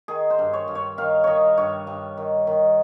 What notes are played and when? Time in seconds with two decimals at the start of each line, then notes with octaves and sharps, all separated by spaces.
0.08 D#3 G#4
0.30 C5
0.39 G2
0.53 C#5
0.68 G2
0.75 C#5
0.98 D#3 F5
1.24 D#3 C#5 D#5
1.57 G2 C#5
1.87 G2
2.17 D#3
2.47 D#3